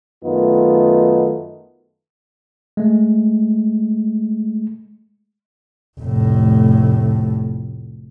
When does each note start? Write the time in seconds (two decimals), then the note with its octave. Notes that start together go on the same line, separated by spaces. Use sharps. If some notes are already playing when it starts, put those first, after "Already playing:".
0.25 F#2 D#3 A3 B3 D#4 F4
2.77 G#3 A3
6.00 F1 A2